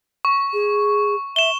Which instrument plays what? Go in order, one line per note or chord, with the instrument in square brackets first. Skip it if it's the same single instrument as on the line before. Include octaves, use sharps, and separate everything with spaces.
[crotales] C#6
[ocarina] G#4
[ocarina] E5 [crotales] E7 G7